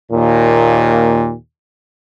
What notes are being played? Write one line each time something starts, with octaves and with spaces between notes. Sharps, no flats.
D#2 A#2